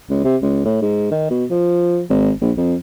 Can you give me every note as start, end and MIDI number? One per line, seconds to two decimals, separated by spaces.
0.09 0.20 37
0.24 0.36 48
0.42 0.62 37
0.65 0.78 45
0.82 1.11 44
1.11 1.26 51
1.30 1.45 47
1.50 2.01 53
2.09 2.31 32
2.41 2.51 34
2.57 2.75 41